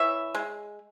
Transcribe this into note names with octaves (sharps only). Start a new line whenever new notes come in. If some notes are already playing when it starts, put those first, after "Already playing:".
Already playing: E3 C#5 E5
G#3